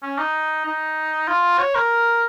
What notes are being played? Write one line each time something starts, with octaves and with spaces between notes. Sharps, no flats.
C#4
D#4
D#4
F4
C#5
A#4